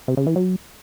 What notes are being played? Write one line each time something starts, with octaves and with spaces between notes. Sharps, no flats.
C3
C#3
E3
F#3